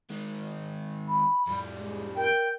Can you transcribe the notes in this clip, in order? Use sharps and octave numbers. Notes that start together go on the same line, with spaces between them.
D#3 G#3
B5
F2 G3
G#3
A#4 G5